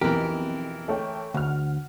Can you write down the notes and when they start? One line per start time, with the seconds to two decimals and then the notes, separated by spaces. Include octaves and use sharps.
0.01 B1 F2 E3 G4 A#4
0.88 A3 C#5 G5
1.34 D2 F#5 F6